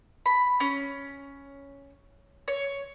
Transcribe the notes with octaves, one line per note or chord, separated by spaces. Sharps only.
B5
C#4
C#5